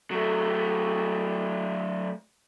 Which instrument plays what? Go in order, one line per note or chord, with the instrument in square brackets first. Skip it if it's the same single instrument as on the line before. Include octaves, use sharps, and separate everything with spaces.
[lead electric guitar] F#3 A3